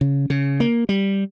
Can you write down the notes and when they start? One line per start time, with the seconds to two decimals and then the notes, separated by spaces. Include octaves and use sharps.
0.01 C#3
0.30 C#3
0.60 A#3
0.89 G3